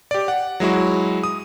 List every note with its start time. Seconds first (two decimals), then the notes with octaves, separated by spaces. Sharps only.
0.11 G4 D5
0.28 F#5
0.60 F#3 G#3 E4 F#4
1.24 D#6